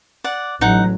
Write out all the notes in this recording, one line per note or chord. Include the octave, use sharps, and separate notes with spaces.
D5 F#5
A1 F#3 D#4 F#5